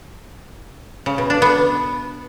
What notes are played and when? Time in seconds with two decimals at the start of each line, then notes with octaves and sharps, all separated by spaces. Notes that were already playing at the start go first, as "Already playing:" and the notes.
1.06 C#3
1.18 B2
1.30 D4
1.42 B3